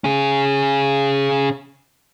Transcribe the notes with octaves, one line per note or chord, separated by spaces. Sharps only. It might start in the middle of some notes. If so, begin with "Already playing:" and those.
C#4 G#4